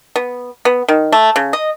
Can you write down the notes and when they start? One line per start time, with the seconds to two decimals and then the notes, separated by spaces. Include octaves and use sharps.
0.16 B3
0.65 B3
0.88 D#3
1.12 A3
1.36 C#3
1.53 D#5